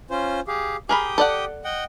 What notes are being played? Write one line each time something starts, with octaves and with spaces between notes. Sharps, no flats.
C#4 F4 C5
G4 G#4 F5
G4 G#4 A#4 G5 B5 D#6
A4 D5 F#5
D#5 F#5 G5